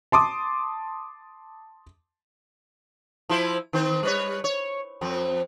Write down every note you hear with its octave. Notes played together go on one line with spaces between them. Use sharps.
A5 C6 D6 D#6
F3 E4 C5
D#3 C4 C5
G3 B4 C#5
C#5
F2 C4